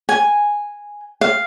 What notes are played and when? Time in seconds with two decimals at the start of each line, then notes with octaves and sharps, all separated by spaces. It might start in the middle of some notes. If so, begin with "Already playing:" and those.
0.09 G#5
1.21 F5